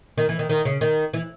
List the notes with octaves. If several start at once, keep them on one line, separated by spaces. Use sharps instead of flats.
D#3
E3
D#3
D#3
C#3
D#3
E3